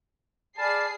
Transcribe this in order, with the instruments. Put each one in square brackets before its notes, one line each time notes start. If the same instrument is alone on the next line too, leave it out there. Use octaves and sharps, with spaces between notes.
[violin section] G#4 C7 [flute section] D5 B5 F6 [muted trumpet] A5